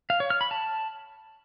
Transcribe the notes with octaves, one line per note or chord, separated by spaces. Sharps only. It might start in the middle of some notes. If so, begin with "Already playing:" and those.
F5
C#5
F6
B5
A5